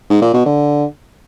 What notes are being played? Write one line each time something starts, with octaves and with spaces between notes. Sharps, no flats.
G#2
A#2
B2
D3